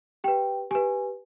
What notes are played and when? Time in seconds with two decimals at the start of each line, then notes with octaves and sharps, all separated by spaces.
0.24 G4 B4 G5
0.71 G4 B4 G#5